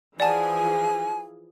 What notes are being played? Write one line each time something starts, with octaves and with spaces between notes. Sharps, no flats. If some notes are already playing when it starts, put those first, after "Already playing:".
E3 F3 G#4 D5 F#5 G#5 A5